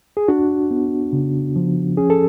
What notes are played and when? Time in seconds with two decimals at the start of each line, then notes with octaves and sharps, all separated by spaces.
0.17 G#4
0.28 D4 F#4
0.71 B3
1.13 C#3
1.56 F3
1.97 C#4 G#4
2.10 A4